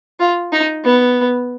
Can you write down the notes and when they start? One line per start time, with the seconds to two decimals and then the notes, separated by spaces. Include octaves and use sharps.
0.20 F4
0.53 D#4
0.84 B3